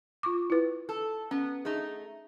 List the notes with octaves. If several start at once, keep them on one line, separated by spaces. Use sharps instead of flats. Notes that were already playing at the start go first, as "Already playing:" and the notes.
F4 C#6 D6
E4 B4
A4
B3 C#4
A3 D#4 G#4